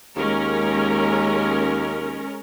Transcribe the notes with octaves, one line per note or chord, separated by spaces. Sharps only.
D#2 G#3 C#4 A#4